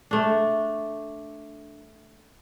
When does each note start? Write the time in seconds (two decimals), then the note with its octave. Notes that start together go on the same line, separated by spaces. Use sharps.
0.11 A3 D4